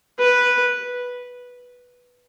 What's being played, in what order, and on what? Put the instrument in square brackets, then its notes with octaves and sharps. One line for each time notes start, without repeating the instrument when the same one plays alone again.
[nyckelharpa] B4